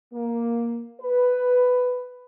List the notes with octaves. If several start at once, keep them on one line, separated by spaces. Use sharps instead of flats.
A#3
B4